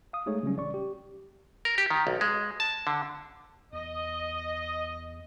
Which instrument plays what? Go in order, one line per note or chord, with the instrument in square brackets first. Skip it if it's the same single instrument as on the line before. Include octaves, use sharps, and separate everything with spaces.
[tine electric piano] F5 D#6
G#3 A3 D#4 G#4 C#5
C#3 F#3 G3 C#4
A1 D5 C#6
G4
[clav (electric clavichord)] A#4
G4
D#3
B1
G#3
A5
D3
[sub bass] E2 [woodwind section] D#5